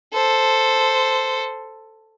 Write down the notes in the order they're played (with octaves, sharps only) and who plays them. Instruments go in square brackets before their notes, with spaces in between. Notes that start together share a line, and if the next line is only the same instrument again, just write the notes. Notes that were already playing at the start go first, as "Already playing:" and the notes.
[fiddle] A4 C5